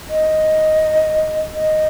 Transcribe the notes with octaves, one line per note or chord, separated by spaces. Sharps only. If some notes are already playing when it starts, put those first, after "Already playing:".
D#5
D#5